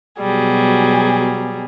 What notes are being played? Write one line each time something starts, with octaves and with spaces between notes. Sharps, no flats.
B2 F#3 G3 G#4